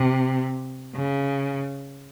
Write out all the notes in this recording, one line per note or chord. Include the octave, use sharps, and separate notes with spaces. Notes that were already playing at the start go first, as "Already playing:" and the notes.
Already playing: C3
C#3